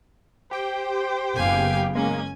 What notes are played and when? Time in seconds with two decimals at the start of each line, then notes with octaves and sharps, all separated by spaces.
0.51 G4 C5 G5
1.36 F#1 B3 F5 G#5
1.95 G#3 A#3 C#4 G#5